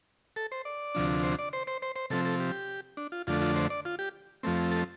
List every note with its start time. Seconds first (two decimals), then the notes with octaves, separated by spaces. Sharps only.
0.36 A4
0.52 C5
0.65 D5
0.95 D2 C3 F3 D4
1.23 C5
1.39 D5
1.53 C5
1.67 C5
1.82 C5
1.96 C5
2.10 C3 F3 C4 A4
2.25 A4
2.40 G4
2.97 D4
3.12 F4
3.27 F2 D3 A3 D4 F4
3.41 F4
3.56 C5
3.70 D5
3.85 F4
3.99 G4
4.43 F2 F3 A3 C4
4.71 A4